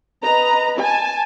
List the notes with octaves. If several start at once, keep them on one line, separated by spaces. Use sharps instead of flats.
B4 D#5 A#5
G#5 A5